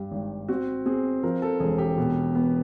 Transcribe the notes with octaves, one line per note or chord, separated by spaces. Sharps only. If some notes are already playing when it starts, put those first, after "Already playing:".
Already playing: G2 G4
G#1
C4 F#4
C4 G#4
F3 A#4
A4
E1 G#4
G4
B2
B3